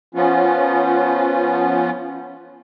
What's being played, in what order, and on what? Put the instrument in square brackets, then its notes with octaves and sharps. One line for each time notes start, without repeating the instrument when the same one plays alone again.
[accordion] F3 B3 C#4 F4